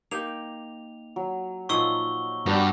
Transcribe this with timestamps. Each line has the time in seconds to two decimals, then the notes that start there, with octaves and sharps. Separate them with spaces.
0.11 A#3 D#4 G4 F7
1.16 F#3
1.69 A#2 F3 D#4 E5 C#6 E6 G7
2.46 G2 B3 D4 F#4 G4 A#4